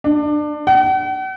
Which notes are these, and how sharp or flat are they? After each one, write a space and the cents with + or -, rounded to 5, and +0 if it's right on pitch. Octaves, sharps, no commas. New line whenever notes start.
D4 +25
F#5 +45